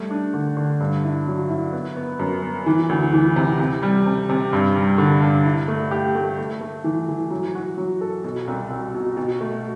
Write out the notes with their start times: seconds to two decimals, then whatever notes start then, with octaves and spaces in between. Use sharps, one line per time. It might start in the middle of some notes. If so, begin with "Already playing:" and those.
Already playing: G3 A3
0.11 D4
0.34 D3
0.57 D3
0.80 G2
1.04 E4
1.27 F#3
1.49 E4
1.73 B3
1.96 B3
2.19 F#2
2.42 B3
2.66 E3
2.89 D2
3.13 E3
3.36 C3
3.59 C3
3.83 G3
4.06 C3
4.29 C3
4.53 G2
4.76 G3
4.98 D3
5.22 G2
5.45 E4
5.68 A3
5.91 G4
6.15 A3
6.38 A3
6.61 A3
6.84 E3
7.08 E3
7.31 F#3
7.55 F#4
7.78 F#3
8.01 A4
8.24 B2
8.47 C2
8.70 C2
8.94 B2
9.17 B2
9.41 A3